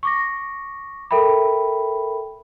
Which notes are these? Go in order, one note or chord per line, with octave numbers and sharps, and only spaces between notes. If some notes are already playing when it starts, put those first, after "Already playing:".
C#6 D6 A#6
A4 A#4 E5 G5 B5